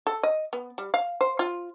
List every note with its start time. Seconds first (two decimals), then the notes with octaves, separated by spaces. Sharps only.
0.07 A4
0.23 D#5
0.53 B3
0.78 G3
0.94 F5
1.21 C5
1.39 F4